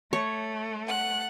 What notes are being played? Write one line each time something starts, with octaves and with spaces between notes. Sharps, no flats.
A3 C#5
F#5 F#6